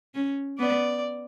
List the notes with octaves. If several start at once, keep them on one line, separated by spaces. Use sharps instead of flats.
C#4
B3 D5